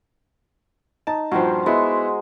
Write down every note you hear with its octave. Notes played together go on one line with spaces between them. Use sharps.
D#4 A5
G2 A#2 F3 F#4 C5
G#3 B3 E4 E5